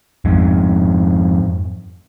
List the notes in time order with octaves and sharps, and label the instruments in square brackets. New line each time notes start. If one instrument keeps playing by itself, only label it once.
[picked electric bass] F2 G#2